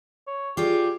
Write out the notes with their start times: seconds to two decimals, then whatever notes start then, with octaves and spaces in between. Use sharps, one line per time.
0.27 C#5
0.57 F4 G4 G#4 D5